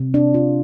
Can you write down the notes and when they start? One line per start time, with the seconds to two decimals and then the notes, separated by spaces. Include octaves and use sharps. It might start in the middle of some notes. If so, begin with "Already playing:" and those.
Already playing: C3
0.14 D4
0.34 F4